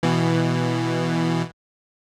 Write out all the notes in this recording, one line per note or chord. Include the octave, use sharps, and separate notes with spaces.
B2 E3